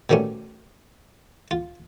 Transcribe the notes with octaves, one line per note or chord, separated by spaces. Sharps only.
B2 D#3 G3 A3 C#4
F4